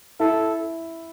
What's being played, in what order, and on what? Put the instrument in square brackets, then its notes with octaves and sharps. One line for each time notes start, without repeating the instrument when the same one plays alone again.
[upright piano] E4 [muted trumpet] A4